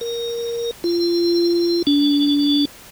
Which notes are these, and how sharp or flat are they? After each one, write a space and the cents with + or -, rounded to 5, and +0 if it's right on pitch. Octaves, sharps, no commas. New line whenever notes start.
A#4 +5
F4 -25
D4 -30